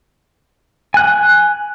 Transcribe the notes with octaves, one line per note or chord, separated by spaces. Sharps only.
G#5 F#6